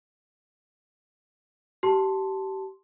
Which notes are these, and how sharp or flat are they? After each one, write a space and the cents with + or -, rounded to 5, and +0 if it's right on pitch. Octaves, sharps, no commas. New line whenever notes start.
G4 -30 A5 +0 C6 +0